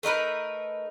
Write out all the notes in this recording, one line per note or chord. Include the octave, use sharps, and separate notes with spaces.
A3 D#4 A#4 B4